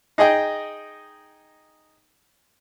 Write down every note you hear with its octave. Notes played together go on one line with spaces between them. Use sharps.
D#4 G#4 D#5 G5